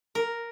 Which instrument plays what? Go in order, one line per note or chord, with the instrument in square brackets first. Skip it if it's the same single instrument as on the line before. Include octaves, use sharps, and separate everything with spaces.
[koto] A#4